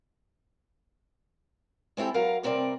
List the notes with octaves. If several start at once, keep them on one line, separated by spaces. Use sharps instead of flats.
G#3 C4 E4 G4 A4
F#3 A#4 F5
G2 C3 C4 A#4 D5